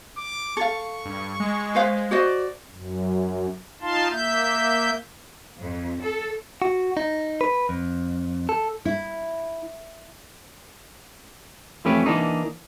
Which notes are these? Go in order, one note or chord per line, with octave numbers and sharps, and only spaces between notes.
D6
A4 F5 C#6
G2
G#3
B4 C5 F5
F#4 C5 D5 D#5
F#2
D#4 F4 F5 A5 C6
A#3 E5 G6
F2
A4
F#4
D#4
B4
F2
A4
E4
F2 E3 A3 C#4 G4 B4
E3 A#3 D4 D#4